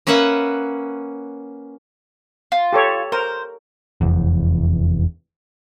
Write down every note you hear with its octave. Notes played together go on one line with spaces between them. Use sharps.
A#3 C#4 B4 E5 F#5
F4
G4 A4 C#5
A#4 C5
F1 E2